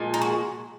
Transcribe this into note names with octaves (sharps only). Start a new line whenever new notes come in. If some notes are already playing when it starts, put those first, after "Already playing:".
Already playing: A#2 F3 G#3
D#4
F#4